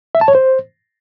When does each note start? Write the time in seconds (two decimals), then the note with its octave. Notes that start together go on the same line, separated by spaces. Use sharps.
0.15 E5
0.21 A5
0.28 C#5
0.35 C5